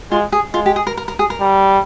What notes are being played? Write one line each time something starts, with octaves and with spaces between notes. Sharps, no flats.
G#3 F4
G#4
G#3 F4
G4
G#4
A#4
A#4
A#4
G#4
A#4
G3